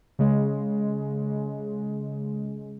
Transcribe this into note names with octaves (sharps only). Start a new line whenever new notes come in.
C#3 G#3